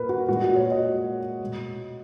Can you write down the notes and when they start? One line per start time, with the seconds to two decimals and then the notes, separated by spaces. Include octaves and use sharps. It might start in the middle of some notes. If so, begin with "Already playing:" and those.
Already playing: A#2 A#4 B4
0.09 F#4
0.28 A#2 G#3 F#4
0.42 F#4
0.56 C#5
0.71 D#5
1.40 B2 G#3